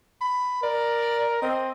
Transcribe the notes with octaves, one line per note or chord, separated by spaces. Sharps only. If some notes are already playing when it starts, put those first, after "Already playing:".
B5
A#4 D5
C4 D#5